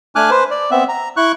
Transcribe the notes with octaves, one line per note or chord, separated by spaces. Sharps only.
A3 D4 G#5 D6 F6 F#6
B4 C5
D5
B3 C4 E5
A#5
E4 C#6 F#6